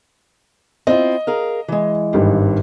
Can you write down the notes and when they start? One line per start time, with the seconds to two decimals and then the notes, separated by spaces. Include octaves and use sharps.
0.87 C4 E4 F4 D#5
1.27 G#4 A#4 F5
1.68 E3 G#3
2.13 G#1 G2 G4